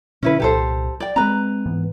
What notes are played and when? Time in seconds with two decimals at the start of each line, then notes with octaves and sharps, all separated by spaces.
0.23 B2 D3 C#4 E4 B4
0.40 C2 A#2 G4 A4 C5
1.00 D5 G5
1.16 G#3 A#3 C4 B4 A#5
1.66 G#2 E3 B3